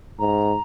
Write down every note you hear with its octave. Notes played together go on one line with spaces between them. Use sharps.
G#2 A#5